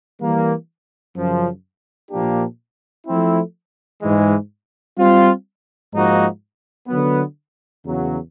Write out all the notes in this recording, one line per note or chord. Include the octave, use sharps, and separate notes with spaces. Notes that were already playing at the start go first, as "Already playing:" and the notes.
E3 G3 A#3
F#2 C#3 F3
A#2 F3 A#3 D4 G4
F3 A3 C4 E4
G#2 E3 G#3
G3 C4 F4
G#2 F3 A#3 D#4 F#4
D3 F#3 B3
E2 C#3 F#3